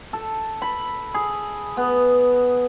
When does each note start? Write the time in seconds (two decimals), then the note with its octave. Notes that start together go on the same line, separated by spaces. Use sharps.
0.13 A4
0.62 B5
1.14 G#4
1.77 B3